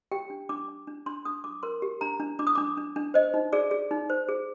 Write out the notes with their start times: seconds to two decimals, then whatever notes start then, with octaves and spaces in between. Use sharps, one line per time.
0.12 G4 G5
0.30 D4
0.49 D4 D6
0.68 D4
0.87 D4
1.06 D4 C6
1.25 D4 D#6
1.44 D4 D6
1.63 A#4 C6
1.82 G4
2.01 D4 A#5
2.20 D4
2.39 D4 D6
2.47 D#6
2.55 D4 D6
2.77 D4
2.96 D4
3.14 C5 D#5
3.34 D#4
3.53 G#4 D5
3.71 G#4
3.91 D#4
4.10 C5
4.28 G#4